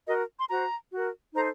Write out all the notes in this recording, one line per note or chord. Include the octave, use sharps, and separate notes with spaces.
F#4 A#4 D#5
C6
F#4 C5 A#5
F#4 A#4
D#4 A4 C5 A#5